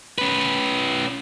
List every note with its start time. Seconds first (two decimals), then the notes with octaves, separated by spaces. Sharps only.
0.18 C#4 B4